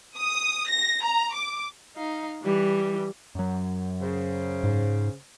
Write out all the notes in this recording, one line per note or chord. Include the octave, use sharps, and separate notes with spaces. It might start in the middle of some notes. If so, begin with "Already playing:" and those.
D#6
A#6
A#5
D6
D#4 F5
E3 G3
F#2 F#3
C#3 C5
G#2